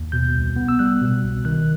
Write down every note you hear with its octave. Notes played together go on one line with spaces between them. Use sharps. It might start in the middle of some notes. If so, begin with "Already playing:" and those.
Already playing: D#2
B2 G6
C2
B3
E6
G3 F#6
B2
C2
D#3 F#6